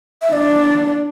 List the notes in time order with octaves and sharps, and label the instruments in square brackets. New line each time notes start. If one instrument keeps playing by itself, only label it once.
[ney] E5
[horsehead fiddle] D4 [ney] D5